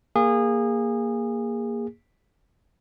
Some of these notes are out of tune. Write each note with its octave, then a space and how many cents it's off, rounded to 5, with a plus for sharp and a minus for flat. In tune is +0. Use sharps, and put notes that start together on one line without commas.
A#3 +0 G#4 -25